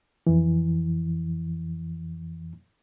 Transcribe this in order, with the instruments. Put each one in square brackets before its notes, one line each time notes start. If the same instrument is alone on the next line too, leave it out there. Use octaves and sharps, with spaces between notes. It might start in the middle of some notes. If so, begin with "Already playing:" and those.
[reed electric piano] F2 E3